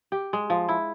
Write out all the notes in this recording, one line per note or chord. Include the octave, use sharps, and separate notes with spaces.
G4
G#3
F3
E4